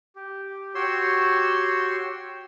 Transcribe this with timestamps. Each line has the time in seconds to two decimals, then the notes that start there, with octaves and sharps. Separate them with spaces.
0.16 G4
0.75 F#4 G4 C#5 C6 E6